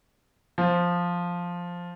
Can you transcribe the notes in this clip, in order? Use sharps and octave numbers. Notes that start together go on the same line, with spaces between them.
F3